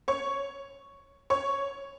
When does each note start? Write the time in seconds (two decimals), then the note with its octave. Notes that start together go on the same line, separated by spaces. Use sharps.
0.08 C#5 C#6
1.30 C#5 C#6